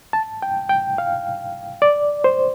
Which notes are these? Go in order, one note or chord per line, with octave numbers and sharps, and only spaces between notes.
A5
G5
G5
F5
D5
C5